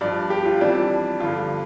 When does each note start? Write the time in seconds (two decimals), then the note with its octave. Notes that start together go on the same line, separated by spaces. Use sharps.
0.01 G2 F3 D5
0.30 G4
0.46 F4
0.61 F2 E3 G3 D4
0.90 D4
1.20 G2 D3 F3 F4